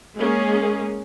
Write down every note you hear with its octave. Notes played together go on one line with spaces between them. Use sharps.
G#3 A#3 C#4 G#4